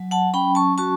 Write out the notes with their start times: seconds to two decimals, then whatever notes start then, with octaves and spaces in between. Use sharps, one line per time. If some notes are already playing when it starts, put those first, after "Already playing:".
Already playing: F#3
0.11 F#5 A5
0.34 C#4 G5 B5
0.55 A5 C#6
0.78 F#4 A5 C#6